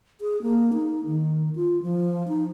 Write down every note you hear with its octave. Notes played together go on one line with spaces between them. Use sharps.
G#4
A#3
D#4
D#3
F4
F3
D#4